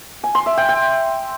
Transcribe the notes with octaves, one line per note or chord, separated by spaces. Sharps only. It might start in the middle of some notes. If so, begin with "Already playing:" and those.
G#5
C6
E5
G5
G5